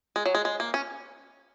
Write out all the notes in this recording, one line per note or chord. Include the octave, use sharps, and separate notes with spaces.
G#3
F#3
G#3
G#3
A#3
C#4